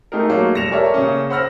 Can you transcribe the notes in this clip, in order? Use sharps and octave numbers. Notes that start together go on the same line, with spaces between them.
A3 D#4 G4 G#4 A#4
F#3 A3 A#3 F#4 C#5
F1 G3 A#6 C#7 E7 F7
G4 A4 A#4 C#5 D5 E5
C#3 A#3 C#4
C5 F#5 B5 E6 F6 A#6